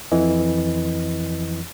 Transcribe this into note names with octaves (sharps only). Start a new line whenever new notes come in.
F2 E3 D#5